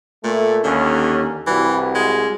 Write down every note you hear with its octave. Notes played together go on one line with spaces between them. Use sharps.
A#2 A3
D#2 D3 C#4
C2 E3 G3 F#4
G#3